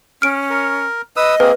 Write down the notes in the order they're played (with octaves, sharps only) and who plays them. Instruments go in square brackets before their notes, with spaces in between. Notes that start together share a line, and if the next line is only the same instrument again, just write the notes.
[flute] C#4 [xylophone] F6 D7
[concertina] A#4
[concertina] B4 D#6 E6 [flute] D#5
[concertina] A#3 C4 G#4 [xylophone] B4